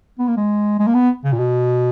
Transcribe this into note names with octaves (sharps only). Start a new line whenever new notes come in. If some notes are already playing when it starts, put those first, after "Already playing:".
B3
A#3
G#3
G#3
A#3
B3
C#3
A#2
B2